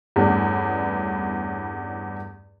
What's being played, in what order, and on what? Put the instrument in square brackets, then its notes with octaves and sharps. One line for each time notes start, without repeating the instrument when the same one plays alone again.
[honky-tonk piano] E2 G2 A3 B3 C#4 D4